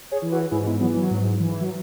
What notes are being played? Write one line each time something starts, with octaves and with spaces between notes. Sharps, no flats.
G#4 C#5
E3
F#4 B4
G#2 E4 G#4
B3 E4
E3 F#3 B3
F#3
G#2
E3
F#3